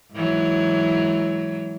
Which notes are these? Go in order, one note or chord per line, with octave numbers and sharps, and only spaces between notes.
G#2 E3 F#3